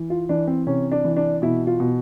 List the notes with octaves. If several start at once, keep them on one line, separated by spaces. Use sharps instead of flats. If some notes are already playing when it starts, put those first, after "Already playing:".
Already playing: E3
F4
E3 D4
C4
C3 C#4
D4
E3
D4
B2 E4
F4
B2